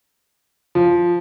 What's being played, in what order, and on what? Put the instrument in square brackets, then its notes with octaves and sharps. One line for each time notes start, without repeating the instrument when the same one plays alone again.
[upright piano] F3